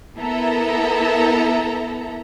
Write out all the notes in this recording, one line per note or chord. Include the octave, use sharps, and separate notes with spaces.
B3 E4 A4 A#4 E5 A#5